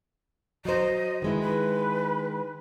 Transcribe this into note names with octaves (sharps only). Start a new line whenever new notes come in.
F#3 C5 D#5
D#3 G#3 E4 B4
B4